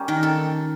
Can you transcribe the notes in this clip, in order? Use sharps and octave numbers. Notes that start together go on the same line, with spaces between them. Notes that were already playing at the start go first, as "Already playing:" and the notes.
Already playing: G3 A#3 C#4 G4
D#3 A#4
A4